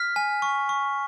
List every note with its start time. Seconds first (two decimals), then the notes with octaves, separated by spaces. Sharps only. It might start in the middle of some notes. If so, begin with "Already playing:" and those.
Already playing: F6 B6
0.16 G#5
0.42 C#6
0.69 C#6